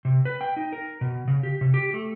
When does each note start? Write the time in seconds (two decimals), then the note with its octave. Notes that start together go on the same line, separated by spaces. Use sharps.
0.05 C3
0.25 B4
0.41 G5
0.57 D#4
0.73 A#4
1.01 B2
1.28 C#3
1.43 G4
1.61 C3
1.74 G4
1.94 A3